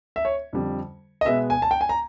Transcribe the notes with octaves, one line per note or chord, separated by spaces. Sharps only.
E5
C#5
F2 D3 G3
D#5
B2 G#3 B3 E5
G#5
A5
G5
G#5
A#5